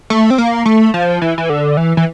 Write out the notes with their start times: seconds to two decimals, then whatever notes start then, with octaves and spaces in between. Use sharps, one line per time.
0.10 A3
0.30 C4
0.38 A#3
0.66 A3
0.94 F3
1.22 E3
1.38 E3
1.50 D3
1.77 E3
1.97 E3